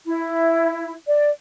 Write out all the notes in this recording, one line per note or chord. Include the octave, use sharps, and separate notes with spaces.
E4
D5